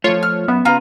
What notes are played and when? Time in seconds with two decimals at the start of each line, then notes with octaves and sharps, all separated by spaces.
0.04 F3 A3 F4 C#5
0.23 F6
0.48 F#2 B3 E5
0.65 C#3 F4 F#4 B4 A#5